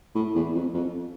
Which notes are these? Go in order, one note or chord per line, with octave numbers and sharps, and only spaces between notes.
A2
E2
F2
F2